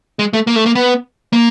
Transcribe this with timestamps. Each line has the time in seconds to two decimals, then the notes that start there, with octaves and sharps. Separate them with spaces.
0.19 G#3
0.33 A3
0.47 A#3
0.56 A3
0.66 A#3
0.75 B3
1.33 A#3